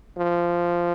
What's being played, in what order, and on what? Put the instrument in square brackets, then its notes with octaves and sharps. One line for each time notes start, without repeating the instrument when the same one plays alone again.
[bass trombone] F3